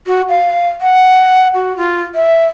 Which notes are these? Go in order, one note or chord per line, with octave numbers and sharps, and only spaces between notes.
F#4
F5
F#5
F#4
F4
E5